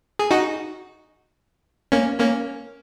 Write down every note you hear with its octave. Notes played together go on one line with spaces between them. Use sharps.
G#4
D#4 F#4
A#3 C#4
A#3 C#4